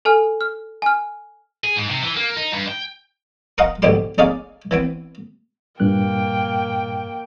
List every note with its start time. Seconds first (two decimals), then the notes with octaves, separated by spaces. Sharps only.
0.05 A4 G#5 F6
0.41 F6
0.82 G#5 F6
1.64 G#4
1.76 G#2
1.89 C3
2.03 E3
2.16 A#3
2.37 D#4
2.53 G2
2.68 G5
3.58 D#5 F5 F#5 A#5 C6 C#6
3.82 A#1 G#2 B2 D3 G4 C6
4.18 C#4 D#4 G#4 D5 F5
4.71 E3 B3 C4
5.80 G2 A#2 A#3 G5 F#6